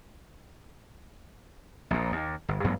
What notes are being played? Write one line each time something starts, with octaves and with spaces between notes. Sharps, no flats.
A#1 A#2
D#2
G1
A1 G2 F#3 B3